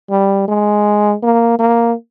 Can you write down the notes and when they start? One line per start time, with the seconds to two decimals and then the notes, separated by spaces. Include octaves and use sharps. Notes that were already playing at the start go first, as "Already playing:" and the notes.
0.10 G3
0.48 G#3
1.23 A#3
1.59 A#3